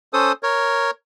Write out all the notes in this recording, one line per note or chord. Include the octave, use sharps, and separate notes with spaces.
C#4 A4 C5 D#6
A#4 C#5